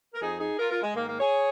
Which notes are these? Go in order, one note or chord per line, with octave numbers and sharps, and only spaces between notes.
A#4
F2 F3 D#4 G#4
D#4 G#4
F4 A#4
F4 A#4
G#3
G#2 D#3 A#3
A#3
G#4 C#5